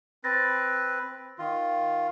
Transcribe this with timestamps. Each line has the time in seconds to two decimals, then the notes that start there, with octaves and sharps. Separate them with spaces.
0.24 C4 B4 A6 A#6
1.39 D#3 F4